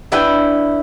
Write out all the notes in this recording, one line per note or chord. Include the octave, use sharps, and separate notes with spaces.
D4 E4 B4 G5 G#5